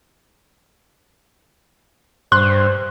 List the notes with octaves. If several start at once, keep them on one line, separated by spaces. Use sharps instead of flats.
G2 C5 C6 F#6